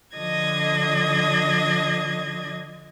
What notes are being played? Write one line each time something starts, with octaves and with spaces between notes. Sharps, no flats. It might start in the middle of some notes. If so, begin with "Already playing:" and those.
D3 F3 D4 D#5 G#6 A#6